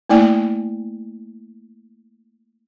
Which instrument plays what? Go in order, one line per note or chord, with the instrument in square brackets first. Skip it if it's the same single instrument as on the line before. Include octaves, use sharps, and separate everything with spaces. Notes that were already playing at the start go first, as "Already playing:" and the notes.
[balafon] A3 A#3 E4 D5 G5 G#5